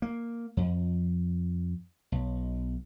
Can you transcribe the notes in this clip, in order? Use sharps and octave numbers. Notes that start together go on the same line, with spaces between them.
A#3
F2
B1